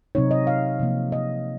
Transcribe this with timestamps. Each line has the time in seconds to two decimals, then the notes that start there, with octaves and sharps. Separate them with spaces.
0.15 C3 F#3 C4 D#4 C#5
0.31 D#5
0.47 F5
0.80 C3 F3 A#3
1.12 D#5